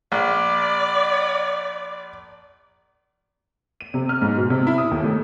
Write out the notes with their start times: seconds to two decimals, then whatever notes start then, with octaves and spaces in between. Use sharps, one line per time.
0.12 A#1 D5
3.81 D#7
3.94 C3
4.09 F6
4.22 G#2
4.37 B2
4.50 C3
4.67 E4
4.78 D#6
4.91 D#2
5.04 A3